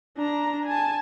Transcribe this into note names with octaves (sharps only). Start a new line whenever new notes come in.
D4 A#5
G#5 A5